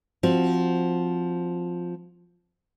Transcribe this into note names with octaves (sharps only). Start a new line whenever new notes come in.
F3 C4 F#4